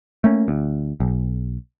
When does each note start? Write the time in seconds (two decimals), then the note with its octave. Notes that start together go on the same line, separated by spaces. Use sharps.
0.24 A3 A#3 C#4
0.48 D2
1.00 B1